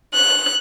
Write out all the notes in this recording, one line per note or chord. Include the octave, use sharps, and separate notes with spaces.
F#6